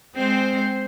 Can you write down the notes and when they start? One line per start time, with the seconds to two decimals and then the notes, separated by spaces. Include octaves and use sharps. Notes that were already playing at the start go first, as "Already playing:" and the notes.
0.15 G#3 C4 C5